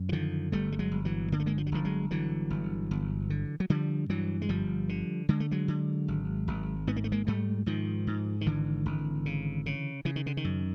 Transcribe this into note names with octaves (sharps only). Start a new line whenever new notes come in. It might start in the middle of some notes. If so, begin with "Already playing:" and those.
Already playing: F#2
E3
D3 D#3 F3
G1 G3 A3
G3
F#3 G#3
G1
E3 F#3
D3 A#3
A3
G#3 A#3
F3
F#3
G1 D#3 F3
F#3 G#3
D3 E3 F#3
G1
G1
D3
F#3
D3 F3 G3
G2 E3 F#3
G#3
G1 F3 G3
D3
D3 G#3
A3
F#3 G#3
D3
G#1
G#1
G#2 B3
A#3
A3
G#3 A#3
G#2 G3 A3
G#2 D#3 F3
G#2
D#3
G#1 D3 E3
G#1
C#3
C#3
C#3 E3
D#3
D3
D#3
F#2